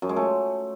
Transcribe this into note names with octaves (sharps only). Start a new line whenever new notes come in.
F#2
G#3
A3